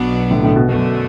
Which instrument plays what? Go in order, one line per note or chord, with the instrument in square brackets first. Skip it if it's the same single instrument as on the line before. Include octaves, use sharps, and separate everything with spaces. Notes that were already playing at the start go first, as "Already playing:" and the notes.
Already playing: [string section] B1 B2 F#3 B3 D4
[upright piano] A2 D3
A2 D3
B2
[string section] F#2 D3 A3 [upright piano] B2